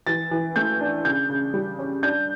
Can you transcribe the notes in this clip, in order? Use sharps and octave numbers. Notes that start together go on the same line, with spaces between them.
E3 A6
E3
A3 G6
D4
C#3 G6
C#3
G3
C#4
D4 G6